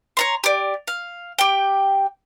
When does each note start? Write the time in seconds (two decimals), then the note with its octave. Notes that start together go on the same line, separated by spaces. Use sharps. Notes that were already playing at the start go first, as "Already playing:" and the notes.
0.17 C#5 A#5 C6
0.44 G4 D5
0.88 F5
1.39 G4 G5